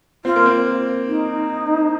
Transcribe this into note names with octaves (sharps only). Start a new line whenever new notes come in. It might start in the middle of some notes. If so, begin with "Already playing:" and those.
C4 F4
A#3
C4
D#4